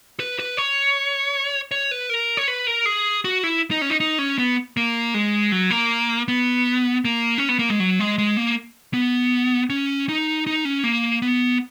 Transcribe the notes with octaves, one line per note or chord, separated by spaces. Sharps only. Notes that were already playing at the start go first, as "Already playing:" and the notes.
B4
B4
C#5
C#5
B4
A#4
C#5
B4
A#4
G#4
F#4
E4
D#4
C#4
D#4
D#4
C#4
B3
A#3
G#3
F#3
A#3
B3
A#3
C#4
B3
A#3
G#3
F#3
G#3
G#3
A#3
B3
C#4
D#4
D#4
C#4
A#3
B3